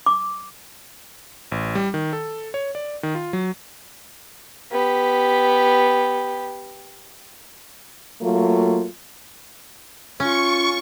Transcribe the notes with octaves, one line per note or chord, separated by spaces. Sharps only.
D6
A1
G3
D#3
A4
C#5
D5
D#3
F4
F#3
B3 G4
F#3 A3 A#3 F4
C#4 F4 C#6